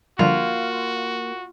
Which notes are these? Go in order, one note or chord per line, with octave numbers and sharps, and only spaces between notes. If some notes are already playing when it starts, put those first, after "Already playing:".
D3 F3 G3 A#3 F4 F#4